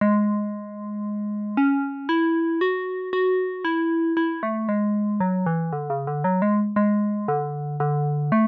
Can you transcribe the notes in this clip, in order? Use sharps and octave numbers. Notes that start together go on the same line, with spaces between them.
G#3
C#4
E4
F#4
F#4
E4
E4
A3
G#3
F#3
E3
D3
C#3
D3
F#3
G#3
G#3
D3
D3
A3